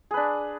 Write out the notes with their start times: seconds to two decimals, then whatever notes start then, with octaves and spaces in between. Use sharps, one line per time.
0.11 G#4
0.14 B4
0.17 D4